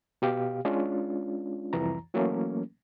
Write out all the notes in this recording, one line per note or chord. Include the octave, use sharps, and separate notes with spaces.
B2 G4 F5
G#3 C#4 D4 F4
C2 F2 E3 A#5
E3 F#3 A3 A#3 C#4